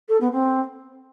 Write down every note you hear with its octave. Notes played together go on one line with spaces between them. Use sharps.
A4
B3
C4